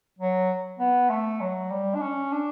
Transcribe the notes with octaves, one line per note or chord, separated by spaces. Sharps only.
F#3
B3
A3
F#3
G3
D4
C#4
D4